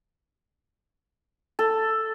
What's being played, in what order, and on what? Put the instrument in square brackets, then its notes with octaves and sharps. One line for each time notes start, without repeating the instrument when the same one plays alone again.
[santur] A4